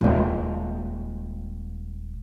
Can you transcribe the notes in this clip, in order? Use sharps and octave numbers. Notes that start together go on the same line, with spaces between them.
D#1 G#3